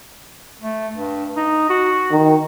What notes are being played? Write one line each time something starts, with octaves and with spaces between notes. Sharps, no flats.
A3
G2
D#4
F#4
D#3